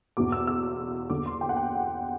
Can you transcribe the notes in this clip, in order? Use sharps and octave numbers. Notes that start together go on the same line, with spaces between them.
E2 B2 D6
E6
E6
E2 D3 D6
C6
G5
F#5
G5